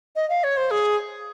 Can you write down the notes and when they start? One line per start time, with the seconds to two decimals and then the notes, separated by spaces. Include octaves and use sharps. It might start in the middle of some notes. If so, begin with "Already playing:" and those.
0.16 D#5
0.30 F5
0.44 C#5
0.57 C5
0.71 G#4